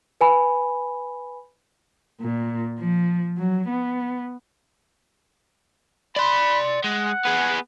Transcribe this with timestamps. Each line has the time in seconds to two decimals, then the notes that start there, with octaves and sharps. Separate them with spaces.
0.21 B4 G#5 B5
2.21 A#2
2.78 F3
3.37 F#3
3.68 B3
6.16 D5 B5 C6
6.84 G#3 F#5
7.25 B3 G#4